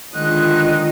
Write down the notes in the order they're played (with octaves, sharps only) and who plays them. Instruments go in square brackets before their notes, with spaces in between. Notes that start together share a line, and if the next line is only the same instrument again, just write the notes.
[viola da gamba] D3 D#3 G#3 [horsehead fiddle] F4 D#5 [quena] F#6